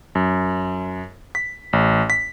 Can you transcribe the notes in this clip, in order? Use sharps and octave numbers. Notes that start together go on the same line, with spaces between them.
F#2
B6
A1
B6